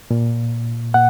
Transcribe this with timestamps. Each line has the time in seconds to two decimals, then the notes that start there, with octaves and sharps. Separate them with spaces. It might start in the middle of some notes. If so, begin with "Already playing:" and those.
0.11 A#2
0.94 A#2 F#5